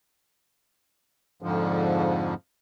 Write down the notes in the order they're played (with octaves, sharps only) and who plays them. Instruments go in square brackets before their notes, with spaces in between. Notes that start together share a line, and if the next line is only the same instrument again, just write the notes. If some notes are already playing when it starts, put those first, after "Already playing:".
[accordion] F2 G#2 D3 F3